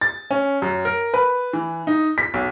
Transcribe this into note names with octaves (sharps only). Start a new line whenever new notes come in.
A6
C#4
F#2
A#4
B4
E3
D#4
B6
B1